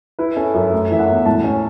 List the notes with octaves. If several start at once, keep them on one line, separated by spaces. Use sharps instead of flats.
E4 B4
C#4 A4
F#2 E5
A3
E3 E5
F#5
E2
A2 A5
C#4